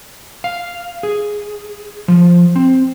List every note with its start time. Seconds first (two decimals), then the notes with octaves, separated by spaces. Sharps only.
0.44 F5
1.03 G#4
2.08 F3
2.56 C4